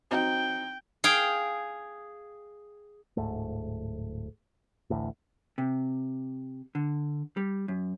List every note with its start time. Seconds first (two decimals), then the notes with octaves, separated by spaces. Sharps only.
0.11 F#3 C4 D#4 G5
1.04 G#4 F5 G5
3.17 D1 G#2 A3
4.90 A1 D2 A2
5.58 C3
6.75 D3
7.37 G3
7.68 F#2